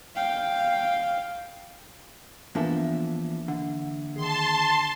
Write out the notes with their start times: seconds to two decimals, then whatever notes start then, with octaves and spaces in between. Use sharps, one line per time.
0.15 F5 G5
2.55 E2 E3 F3 A#3 D4 A4 E5
3.48 D3
4.16 D#3 G#4 A5 C6